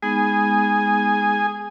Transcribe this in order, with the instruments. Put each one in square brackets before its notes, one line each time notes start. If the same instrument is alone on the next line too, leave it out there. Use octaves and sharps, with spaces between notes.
[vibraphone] G#3 B3 D#4 [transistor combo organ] G#4 G#5